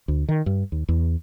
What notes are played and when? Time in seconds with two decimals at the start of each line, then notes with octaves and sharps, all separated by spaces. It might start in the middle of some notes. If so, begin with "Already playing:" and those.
0.08 D2
0.28 D#3
0.46 G2
0.72 D#2
0.88 E2